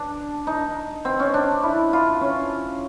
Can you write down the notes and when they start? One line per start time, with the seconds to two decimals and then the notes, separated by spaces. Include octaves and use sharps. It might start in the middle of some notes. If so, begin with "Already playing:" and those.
Already playing: D4
0.47 D#4
1.05 C4
1.19 C#4
1.34 D4
1.63 E4
1.93 F4
2.21 C#4